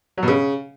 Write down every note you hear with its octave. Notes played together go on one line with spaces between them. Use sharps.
F#3
B2
C#3